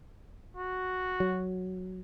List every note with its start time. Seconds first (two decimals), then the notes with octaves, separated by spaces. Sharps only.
0.57 F#4
1.20 F#3